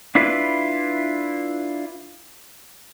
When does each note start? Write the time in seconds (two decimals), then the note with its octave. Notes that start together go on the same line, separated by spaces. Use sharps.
0.15 D4 E4 F4 B4